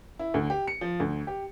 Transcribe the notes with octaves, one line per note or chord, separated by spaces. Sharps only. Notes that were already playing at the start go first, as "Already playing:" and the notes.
E4
D2
G4
C#7
F3
D2
G4